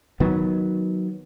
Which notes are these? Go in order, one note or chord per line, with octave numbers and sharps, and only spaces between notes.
D#3 F#3 B3